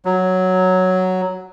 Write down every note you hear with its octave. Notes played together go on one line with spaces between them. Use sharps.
F#3